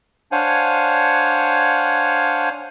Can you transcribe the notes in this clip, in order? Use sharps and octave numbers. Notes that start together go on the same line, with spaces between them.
D4 C5 C#5 F5 F#5 G#5